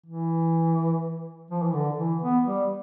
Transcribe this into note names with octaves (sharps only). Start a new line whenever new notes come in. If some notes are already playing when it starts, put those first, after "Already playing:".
E3
F3
E3
D3
E3
B3
G3